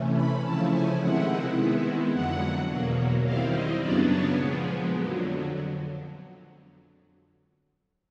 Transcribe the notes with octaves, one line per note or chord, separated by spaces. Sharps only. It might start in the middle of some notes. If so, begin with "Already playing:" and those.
Already playing: C3 E3 A3 C#4
B5
C#3 F3 A3 C#4 E4 A5
G#5
C3 D#3 G#3 C4 E4 F#5
D#3 G#3 B3 E4
F2 D3 F#3 F#5
E2 B2 F#3 A#3
D#3 G3 C4 E4 F5
D#5
F#2 C#3 F#3 B3 D4 D5
C#5
A#2 F3 G#3 B3
F2 D3 F#3